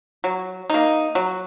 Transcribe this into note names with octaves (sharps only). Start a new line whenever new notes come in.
F#3
A#3 D#4
F#3